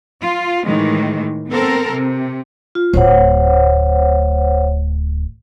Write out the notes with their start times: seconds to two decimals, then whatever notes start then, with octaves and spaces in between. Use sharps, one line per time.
0.21 F4
0.66 A2 D#3 E3 G#3
1.51 B3 C4 A4 A#4
1.92 C3
2.75 F4
2.94 D1 D2 C5 C#5 F#5